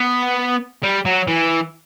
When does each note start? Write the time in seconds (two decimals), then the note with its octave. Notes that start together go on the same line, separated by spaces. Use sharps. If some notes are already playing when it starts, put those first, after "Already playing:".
Already playing: B3
0.83 G3
1.05 F#3
1.27 E3